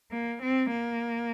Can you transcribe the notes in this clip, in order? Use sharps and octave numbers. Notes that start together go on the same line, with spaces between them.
A#3
C4
A#3